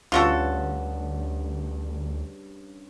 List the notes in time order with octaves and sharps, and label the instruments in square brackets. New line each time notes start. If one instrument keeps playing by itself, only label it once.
[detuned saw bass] D2 [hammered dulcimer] G2 C#3 [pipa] F4 F#4 A4